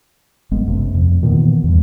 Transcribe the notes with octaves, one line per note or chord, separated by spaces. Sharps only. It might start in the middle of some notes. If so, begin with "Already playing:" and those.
G1 G#3 B3
F#2 C3 A3
F2
A#2 D#3 E3 B3
E2 G2